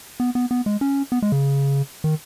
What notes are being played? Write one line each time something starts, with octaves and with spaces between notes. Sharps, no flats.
B3
B3
B3
G#3
C#4
B3
G#3
C#3
D#3